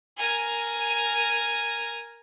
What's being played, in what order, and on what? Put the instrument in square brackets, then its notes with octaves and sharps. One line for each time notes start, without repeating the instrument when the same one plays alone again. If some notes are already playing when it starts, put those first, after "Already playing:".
[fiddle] A#4 G#5